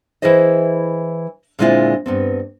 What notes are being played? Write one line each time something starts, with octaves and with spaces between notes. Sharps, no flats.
E3 E4 G#4 C5 D#5
A#2 D3 G#3 C4 E4 F4
G2 B3 C4